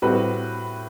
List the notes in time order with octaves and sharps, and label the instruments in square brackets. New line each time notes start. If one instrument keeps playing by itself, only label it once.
[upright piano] A2 G3 C4 F#4 [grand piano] B4